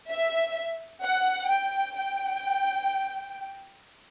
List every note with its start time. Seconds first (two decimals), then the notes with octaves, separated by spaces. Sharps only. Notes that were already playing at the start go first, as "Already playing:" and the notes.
0.09 E5
1.03 F#5
1.49 G5
1.96 G5